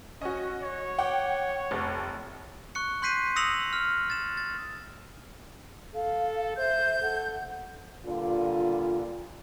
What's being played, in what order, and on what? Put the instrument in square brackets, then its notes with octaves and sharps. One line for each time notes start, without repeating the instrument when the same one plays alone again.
[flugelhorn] C#4 [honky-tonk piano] F#4 D#5
[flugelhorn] C#5
[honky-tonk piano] F#5 G5 D6
F1
[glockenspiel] C#6 F#6 C#7
C6 F#6 G6 B6 C7 D#7
D#6 E6 A#6 C#7 F7 F#7
F6
A6 E7
A6
[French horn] A4 [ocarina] F5
[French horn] C5 [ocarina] E5 [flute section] G6
[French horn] A4 [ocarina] F#5
[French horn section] G2 A#2 D3 F4